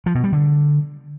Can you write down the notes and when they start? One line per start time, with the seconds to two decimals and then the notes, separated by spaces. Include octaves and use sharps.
0.06 F3
0.15 B2
0.24 G3
0.32 D3